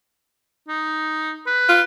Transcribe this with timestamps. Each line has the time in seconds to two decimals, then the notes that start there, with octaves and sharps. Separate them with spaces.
0.68 D#4
1.47 B4
1.69 F4